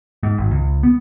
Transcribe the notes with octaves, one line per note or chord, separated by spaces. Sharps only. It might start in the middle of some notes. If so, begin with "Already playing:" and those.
G#2
G#1
C#2
B3